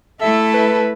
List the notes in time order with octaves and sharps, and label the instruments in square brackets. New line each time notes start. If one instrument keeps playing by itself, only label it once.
[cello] A3 E4 [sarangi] A4 [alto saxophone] E5
[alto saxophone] B4